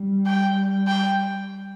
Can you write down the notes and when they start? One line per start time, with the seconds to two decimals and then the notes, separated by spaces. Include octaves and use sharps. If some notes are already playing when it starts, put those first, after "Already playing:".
Already playing: G3
0.26 G5
0.88 G5